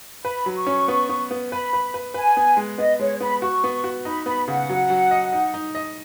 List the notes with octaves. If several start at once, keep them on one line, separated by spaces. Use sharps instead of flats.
B4 B5
F#3
C#6
C#4
B3
B3
B3
B4 B5
B4
B4
B4 G#5
B3
G#3
B3 D#5
G#3 C#5
B3 B5
F#4 C#6
B3
F#4
D#4 B5
B3 B5
C#3 F#5
F#3
F#3
D#5
D#4
D#4
D#5